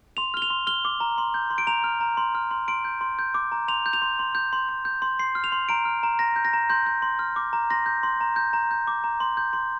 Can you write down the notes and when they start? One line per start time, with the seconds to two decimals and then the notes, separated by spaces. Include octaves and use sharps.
0.17 C6 F7
0.34 F6 G7
0.42 F7
0.50 C6
0.67 F6 G7
0.85 D6
1.00 A#5
1.18 C6
1.34 G6
1.50 C6
1.58 D7
1.67 A#5 F7
1.84 F6
2.01 A#5
2.17 C6
2.35 F6
2.51 C6
2.68 C6 D7
2.85 G6
3.01 C6
3.19 G6
3.34 D6
3.52 A#5
3.68 C6 F7
3.86 G6
3.93 F7
4.02 C6
4.19 C6
4.35 G6
4.53 C6
4.69 C6
4.85 G6
5.02 C6
5.19 C6 C7
5.35 F6
5.44 F7
5.52 C6
5.69 A#5 D7
5.85 F6
6.03 A#5
6.19 A#5 A#6
6.36 G6
6.45 A#6
6.53 A#5
6.70 C6 G6
6.86 G6
7.02 C6
7.19 F6
7.36 D6
7.53 A#5
7.70 C6 A#6
7.86 G6
8.03 C6
8.21 A#5
8.36 G6
8.53 A#5
8.71 G6
8.87 D6
9.04 A#5
9.20 C6
9.37 G6
9.53 C6